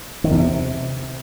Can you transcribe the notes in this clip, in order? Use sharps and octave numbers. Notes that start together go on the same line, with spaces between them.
D#3
E2
C3